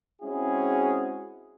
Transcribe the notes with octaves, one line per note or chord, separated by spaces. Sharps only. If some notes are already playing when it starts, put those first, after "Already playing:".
G#3 C4 C#4 E4 F#4 G#4